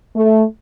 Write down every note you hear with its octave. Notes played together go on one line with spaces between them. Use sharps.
A3